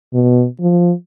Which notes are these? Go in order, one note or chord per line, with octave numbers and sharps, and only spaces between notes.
B2
F3